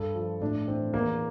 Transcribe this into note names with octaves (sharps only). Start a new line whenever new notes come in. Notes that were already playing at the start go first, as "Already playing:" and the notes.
Already playing: G2 A4
F3
A2 D4
E3 C4
E2 A#3